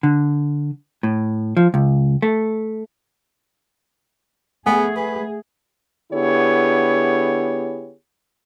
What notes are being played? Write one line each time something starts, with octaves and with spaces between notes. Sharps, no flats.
D3
A2
F3
C#2
A3
A3 B3 G#4 F#5 G#5
B4
D3 B3 E4 G4 G#4 C#5